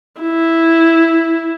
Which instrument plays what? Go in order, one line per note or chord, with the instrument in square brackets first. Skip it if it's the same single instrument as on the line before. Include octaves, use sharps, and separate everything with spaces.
[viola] E4